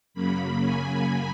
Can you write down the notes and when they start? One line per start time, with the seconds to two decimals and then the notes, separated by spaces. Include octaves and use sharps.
0.14 F#2 C#3 F#3 A#3 B5
0.63 G#5